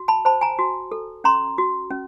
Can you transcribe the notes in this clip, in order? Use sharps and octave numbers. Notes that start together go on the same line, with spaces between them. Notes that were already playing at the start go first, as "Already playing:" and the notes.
Already playing: F#4
A5 B5
C5 A5 B5
G#5 A#5
F#4
A4
C#4 A#5 C6
F#4
C#4